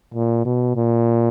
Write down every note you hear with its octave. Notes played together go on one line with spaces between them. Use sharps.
A#2
B2
A#2